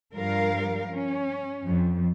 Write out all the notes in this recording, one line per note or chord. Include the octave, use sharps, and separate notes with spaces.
G2 F3 G3 A#4 F5
C#4
F2